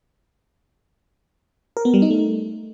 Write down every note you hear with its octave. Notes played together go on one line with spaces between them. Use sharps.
A#4
B3
G3
D#4
A3